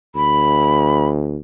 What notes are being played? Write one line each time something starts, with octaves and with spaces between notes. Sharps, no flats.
D2 B5